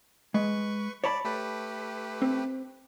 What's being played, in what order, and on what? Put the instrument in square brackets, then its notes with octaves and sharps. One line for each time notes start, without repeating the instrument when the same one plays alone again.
[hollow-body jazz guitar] G#3 [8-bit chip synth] B4 C#6
[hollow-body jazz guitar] C#5 A5 B5 [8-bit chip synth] D5
[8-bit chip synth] A3 G4 B4
[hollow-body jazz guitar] C4